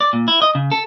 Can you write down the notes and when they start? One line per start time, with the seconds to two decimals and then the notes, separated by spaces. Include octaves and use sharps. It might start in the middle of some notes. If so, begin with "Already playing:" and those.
0.01 D5
0.13 A#2
0.28 E4
0.42 D#5
0.55 C#3
0.72 A4